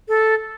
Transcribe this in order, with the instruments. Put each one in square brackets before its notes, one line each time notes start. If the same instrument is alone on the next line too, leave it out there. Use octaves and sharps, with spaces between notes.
[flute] A4